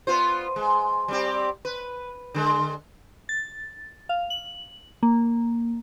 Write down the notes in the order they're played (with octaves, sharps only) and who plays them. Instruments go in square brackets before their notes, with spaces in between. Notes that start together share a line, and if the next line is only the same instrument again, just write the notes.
[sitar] B3 F4 C5
G#3
G3 C4 G4
B4
D3 G#3
[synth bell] A6
F5
F#7
A#3